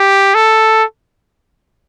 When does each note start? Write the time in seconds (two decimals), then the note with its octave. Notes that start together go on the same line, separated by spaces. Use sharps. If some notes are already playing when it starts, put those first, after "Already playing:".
Already playing: G4
0.34 A4